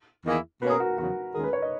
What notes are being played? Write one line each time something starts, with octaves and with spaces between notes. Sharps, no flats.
E2 D#3 A#3 E4 G#4
B2 A#3 C#4 G#4 B4
A#4
F#4
E2 C#3 F#3 F#4
D#2 D#3 G#3 C#4 G#4 A#4
B4
C#5
D#5